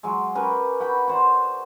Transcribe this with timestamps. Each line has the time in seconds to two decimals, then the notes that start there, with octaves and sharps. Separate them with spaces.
0.03 F#3 G#3
0.35 C#4 G4 A#4 B4
0.80 F#4 G5 B5
1.07 F#4 C5 D5